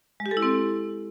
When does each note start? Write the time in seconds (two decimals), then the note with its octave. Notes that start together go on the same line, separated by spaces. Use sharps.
0.20 G#3
0.26 G4
0.31 A4
0.37 E4
0.42 C4